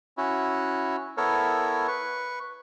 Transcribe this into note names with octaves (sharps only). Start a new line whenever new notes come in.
C#4 E4 F#4
B3 E4 A4 A#4 C#5
B4 C#6